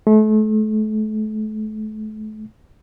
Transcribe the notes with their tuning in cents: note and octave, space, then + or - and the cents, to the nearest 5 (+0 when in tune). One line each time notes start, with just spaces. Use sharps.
A3 -35